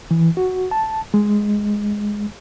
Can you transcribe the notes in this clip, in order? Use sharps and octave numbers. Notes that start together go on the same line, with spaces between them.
E3
F#4
A5
G#3